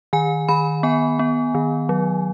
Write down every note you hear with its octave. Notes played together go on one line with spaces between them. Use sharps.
D#3 G#5
D#3 B5
B3 G#5
B3
D#3
F#3